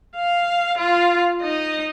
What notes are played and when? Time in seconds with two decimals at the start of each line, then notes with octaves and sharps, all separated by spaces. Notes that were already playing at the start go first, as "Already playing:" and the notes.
0.16 F5
0.78 F4
1.41 D#4 D#5